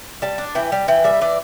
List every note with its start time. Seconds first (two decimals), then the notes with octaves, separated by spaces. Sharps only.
0.22 G3 A5
0.38 D4
0.55 E3 G5
0.72 G3
0.88 E3 G5
1.04 G3 E5
1.21 E3 D5